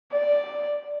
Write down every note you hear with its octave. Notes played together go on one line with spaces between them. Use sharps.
D5